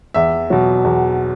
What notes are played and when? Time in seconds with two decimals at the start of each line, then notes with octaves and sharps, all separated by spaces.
0.14 E2 E5
0.50 B2 F#3
0.84 E2